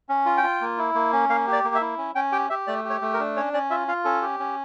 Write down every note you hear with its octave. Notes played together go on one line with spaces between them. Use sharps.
C#4
F4
G5
F4
A#3
E4
A#3
C#4
A#3 F5
G4
D5
A#3
E5
E4
C#4
C#4 G5
G4 G5
G4 E5
A3 D5
G4
C#5
A3
A#4
D4
C#4 C#5
C#4 D5
F4 E5
F4 F5
C#4 A4
G4
C#4